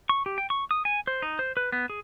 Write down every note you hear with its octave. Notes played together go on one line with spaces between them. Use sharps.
C#6
G4
G5
C#6
D#6
G#5
C5
D#4
C5
B4
B3
G#4